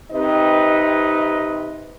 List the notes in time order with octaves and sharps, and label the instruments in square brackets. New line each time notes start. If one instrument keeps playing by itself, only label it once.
[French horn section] C3 C4 D#4 B4 D#5